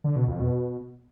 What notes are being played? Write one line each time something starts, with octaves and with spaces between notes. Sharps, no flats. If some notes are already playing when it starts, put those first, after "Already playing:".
D3
B2
F2
B2